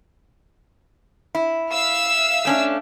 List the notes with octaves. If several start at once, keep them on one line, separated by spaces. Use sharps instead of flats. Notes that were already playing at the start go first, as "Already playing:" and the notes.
E4
E5 F5 E6
A3 C#4 D4